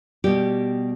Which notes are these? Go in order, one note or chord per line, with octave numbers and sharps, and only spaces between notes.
B2 G3 G4